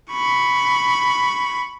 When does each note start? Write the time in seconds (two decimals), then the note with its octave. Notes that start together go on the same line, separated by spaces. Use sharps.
0.12 B5 C#6